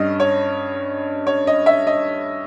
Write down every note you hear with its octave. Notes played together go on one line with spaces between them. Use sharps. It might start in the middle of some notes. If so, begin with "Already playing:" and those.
Already playing: G2 G3 C#4 D#5
C#5
C#5
D#5
E5
D#5